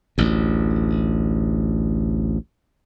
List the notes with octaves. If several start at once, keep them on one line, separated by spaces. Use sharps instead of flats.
A1 D2